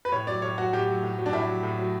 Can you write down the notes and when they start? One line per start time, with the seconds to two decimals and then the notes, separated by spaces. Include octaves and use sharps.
0.05 B4
0.12 A2 C#5
0.27 F#3 D5
0.42 A2 C#5
0.58 F#3 F#4
0.73 A2 G4
0.87 F#3
1.03 A2
1.19 F#3
1.26 D4
1.33 A2 E4
1.48 F#3
1.63 A2
1.79 F#3